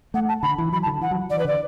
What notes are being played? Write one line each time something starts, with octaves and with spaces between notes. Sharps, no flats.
A3 F#5
A5
D3 B5
E3
F#3 B5
A5
D3
E3 F#5
F#3
E3 D5
B4
D3 D5